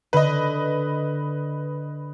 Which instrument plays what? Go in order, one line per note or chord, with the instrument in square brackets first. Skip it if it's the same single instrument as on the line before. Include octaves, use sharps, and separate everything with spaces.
[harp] D3 [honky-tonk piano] B4 D#5